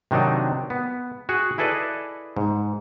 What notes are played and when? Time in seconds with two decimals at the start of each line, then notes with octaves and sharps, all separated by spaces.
0.11 C3 D#3 F#3 D4 D#4
0.70 B3
1.29 F#4 G#4 F#5
1.58 E4 G#4 A4 B4 D5 D#5
2.37 G#2